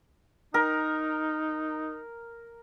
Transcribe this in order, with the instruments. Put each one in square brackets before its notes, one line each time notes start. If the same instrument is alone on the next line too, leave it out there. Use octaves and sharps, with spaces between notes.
[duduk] D#4 [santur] A#4